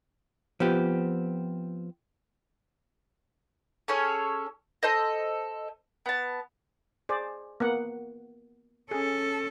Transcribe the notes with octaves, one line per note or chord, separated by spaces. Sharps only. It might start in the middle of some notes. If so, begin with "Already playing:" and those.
F3 B3 C4 G4
C#4 G#4 A4 C#5
A4 C5 D#5
B3 A5
G#4 C5 D5
A#3 B3 F#5
C#4 G#4 A4